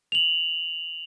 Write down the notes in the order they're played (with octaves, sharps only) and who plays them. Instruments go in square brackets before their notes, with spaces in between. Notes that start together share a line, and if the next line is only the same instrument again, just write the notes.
[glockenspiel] F7 F#7